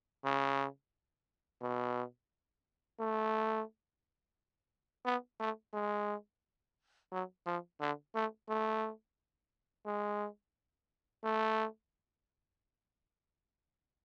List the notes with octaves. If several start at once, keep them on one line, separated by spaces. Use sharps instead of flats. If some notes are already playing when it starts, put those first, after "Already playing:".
C#3
B2
A3
B3
A3
G#3
F#3
F3
D3
A3
A3
G#3
A3